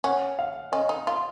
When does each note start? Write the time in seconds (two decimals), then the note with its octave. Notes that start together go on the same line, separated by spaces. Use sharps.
0.04 C#4 F#5
0.39 F5
0.72 C#4 D#5
0.89 D#4
1.07 F4